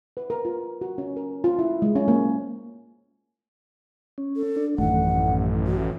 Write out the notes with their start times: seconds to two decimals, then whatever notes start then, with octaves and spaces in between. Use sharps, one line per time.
0.17 B4
0.30 A#4
0.45 F4
0.81 F#4
0.98 C#4
1.17 A#4
1.44 F4
1.59 E4
1.82 G#3
1.96 C#4
2.08 A#3
4.18 C#4
4.36 A4
4.56 D4
4.78 A1 F#2 D#3 A3 F#5
5.67 F#4